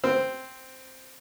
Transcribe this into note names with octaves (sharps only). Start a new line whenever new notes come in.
C4